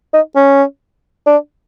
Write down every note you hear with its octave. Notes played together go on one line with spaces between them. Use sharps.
D#4
C#4
D4